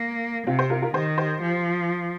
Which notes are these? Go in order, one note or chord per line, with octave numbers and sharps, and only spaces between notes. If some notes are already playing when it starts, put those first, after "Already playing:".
Already playing: A#3
C3 C4 F4
G4 C5
F4 A#4
F4 A#4
D#3 G4 C5
G4 C5
F3